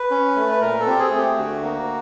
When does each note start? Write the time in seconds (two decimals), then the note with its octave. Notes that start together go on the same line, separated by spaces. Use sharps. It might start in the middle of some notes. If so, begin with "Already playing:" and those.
Already playing: B4
0.11 C#4
0.36 A3
0.51 B4
0.61 A#2 A#4
0.81 A4
0.86 C4 G4
0.99 G#4
1.11 A3
1.18 G4
1.37 D2 F#4
1.63 A#3